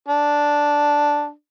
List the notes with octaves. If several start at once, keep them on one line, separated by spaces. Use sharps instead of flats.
D4